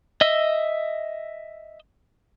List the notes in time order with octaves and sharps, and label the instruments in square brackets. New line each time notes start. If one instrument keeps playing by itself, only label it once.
[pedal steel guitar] D#5 E5 E6